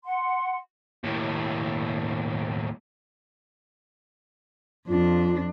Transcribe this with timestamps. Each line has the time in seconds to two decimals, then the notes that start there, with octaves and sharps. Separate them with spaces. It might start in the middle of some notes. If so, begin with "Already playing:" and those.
0.05 F#5 C6
1.04 D#2 A2
4.88 F2 D4 F4